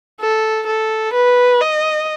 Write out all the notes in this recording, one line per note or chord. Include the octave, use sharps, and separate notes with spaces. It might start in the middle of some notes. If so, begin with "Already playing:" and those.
A4
A4
B4
D#5